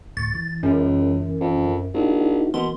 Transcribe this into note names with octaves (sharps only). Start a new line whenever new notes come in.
D2 A2 C#6 A6
E3
C#2 F#2
F2
A#1 D#4 E4 F#4
B2 E3 A#3 C6